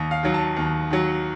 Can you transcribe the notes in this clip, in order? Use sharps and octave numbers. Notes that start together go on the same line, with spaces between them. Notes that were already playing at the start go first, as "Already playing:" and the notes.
Already playing: D#2
F5
D#3 F#3
A5
D#2
D#3 F#3